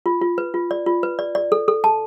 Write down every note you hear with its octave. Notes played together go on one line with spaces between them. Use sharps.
F4
F4
B4
F4
D5
F4
B4
D5
D5
A4
A4
A5